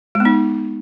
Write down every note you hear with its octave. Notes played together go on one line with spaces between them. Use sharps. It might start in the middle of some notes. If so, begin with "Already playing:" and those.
G#3
B3
D#4